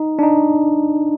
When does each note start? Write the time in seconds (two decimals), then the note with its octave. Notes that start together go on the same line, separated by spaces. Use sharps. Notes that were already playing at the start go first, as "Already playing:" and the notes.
Already playing: D#4
0.19 D4
0.23 D#4